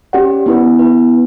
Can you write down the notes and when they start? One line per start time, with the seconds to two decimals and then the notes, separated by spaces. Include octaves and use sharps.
0.13 C#4 G4 D5 F#5
0.46 B3 E4 B4
0.79 B3 E4 B4